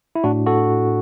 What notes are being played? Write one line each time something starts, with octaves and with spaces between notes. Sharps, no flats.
E4
A2 D4 F#4
F#4 A4